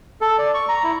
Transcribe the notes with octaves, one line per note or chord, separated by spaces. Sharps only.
A4
D5
C#6
A#5
E4